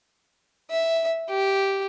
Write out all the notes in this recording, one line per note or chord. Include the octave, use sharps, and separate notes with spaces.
E5
G4